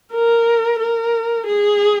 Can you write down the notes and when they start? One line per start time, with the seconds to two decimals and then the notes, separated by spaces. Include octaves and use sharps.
0.13 A#4
0.80 A#4
1.47 G#4